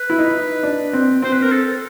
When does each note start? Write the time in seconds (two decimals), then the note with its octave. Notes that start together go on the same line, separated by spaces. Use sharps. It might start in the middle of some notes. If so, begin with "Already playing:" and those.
Already playing: B4
0.10 E4
0.18 D#4
0.63 D4
0.93 C4
1.22 C4 C5
1.33 B4
1.43 A#4
1.52 A4